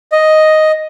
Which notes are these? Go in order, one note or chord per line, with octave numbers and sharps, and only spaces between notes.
D#5